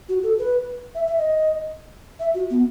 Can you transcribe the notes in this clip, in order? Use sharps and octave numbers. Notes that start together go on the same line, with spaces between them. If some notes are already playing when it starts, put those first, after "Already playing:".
F#4
A4
B4
E5
E5
D#5
E5
F#4
B3